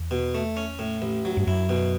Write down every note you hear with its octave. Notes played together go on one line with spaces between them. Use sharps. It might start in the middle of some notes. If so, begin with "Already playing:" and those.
Already playing: E2
B2
A3
C#4
A2
A1
F#3
G2
F#2 E4
B2